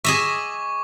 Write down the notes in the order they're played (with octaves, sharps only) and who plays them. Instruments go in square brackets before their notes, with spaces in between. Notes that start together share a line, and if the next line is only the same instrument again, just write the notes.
[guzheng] G#4 D#5 E5 [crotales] C#6 D6